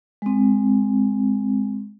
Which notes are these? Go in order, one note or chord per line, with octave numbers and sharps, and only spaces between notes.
G#3 C4